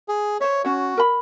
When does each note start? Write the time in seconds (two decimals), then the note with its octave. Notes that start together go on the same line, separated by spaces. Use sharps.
0.08 G#4
0.41 C5 C#5 E5
0.65 C#4 F#4 C#5
0.97 A#4 B5